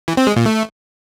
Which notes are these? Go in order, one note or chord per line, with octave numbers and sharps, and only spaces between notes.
E3
C4
G#3
A#2
A3